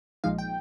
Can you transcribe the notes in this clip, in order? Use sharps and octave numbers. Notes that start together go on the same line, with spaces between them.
A#1 A#2 F3 G#3 D#4 F5
G5